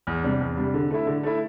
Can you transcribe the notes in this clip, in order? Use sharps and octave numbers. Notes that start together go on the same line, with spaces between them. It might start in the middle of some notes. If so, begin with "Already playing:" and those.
E2
C3 G3 D4
E2
C3 G3 D4
D3
A3 E4
D3
A3 E4